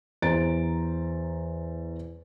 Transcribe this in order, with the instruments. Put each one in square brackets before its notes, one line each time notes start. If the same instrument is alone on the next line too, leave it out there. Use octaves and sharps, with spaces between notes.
[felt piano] E2 C5 A#5 A6 D7